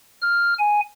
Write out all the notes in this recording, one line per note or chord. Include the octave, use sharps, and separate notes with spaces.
F6
G#5